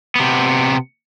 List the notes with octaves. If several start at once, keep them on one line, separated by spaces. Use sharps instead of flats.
C3 B3